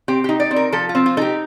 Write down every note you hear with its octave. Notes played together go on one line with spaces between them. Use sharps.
C4 G4
D#4 G4
D5
C4
A#4
F3 A4
F4
C4
F4
D#4 G4 A4